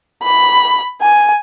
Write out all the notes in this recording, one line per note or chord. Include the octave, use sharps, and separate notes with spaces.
B5
G#5